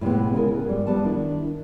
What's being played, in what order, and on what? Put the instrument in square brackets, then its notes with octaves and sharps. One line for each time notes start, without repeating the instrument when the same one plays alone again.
[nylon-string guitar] A2 C3 G#3 B3
C#3 G#3 E4 G4 G#4 A#4
B3
G#2 G3
G3 B3 A5
D#3 D4 E4